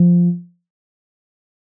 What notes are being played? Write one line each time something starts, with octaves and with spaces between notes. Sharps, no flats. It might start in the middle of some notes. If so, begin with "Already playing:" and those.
Already playing: F3